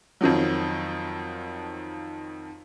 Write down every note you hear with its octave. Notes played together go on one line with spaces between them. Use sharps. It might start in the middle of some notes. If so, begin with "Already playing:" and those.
F2 D#3 F3 F#3